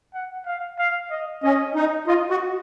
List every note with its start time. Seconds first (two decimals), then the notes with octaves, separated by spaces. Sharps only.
0.14 F#5
0.46 F5
0.79 F5
1.11 D#5
1.43 C#4 D#5
1.75 D#4
2.07 F4 D#5
2.30 F#4